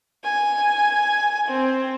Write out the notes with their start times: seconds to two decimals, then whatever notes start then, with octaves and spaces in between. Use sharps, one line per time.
0.24 G#5
1.49 C4